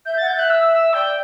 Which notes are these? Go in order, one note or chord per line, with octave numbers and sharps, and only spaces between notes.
E5 G6
F#5 A6
G6
E5 F#6
E6
E6
D5 G5